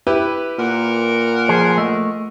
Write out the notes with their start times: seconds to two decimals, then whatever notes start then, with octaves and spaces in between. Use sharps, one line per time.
0.07 E4 G4 B4
0.58 A#2 A#4 F#5
1.49 F3 G#4 C5
1.78 A3 D#5